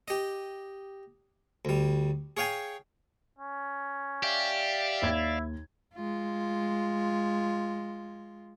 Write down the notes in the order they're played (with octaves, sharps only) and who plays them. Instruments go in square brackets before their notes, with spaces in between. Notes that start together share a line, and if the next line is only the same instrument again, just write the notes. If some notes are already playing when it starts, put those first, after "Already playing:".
[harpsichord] G4 D#5
D2 G3
G#4 C#5 F5 G5 G#5
[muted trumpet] C#4
[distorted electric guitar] G4 [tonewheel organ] D5 E5 F5
[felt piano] D#2 G#6 [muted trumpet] E4
[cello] G#3 F4